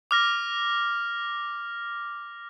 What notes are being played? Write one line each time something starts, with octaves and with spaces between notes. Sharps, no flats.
D6 F6 A#6